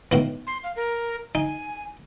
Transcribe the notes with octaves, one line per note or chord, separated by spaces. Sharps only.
A2 D#3 B3
C6
F5
A#4
D#4 G#5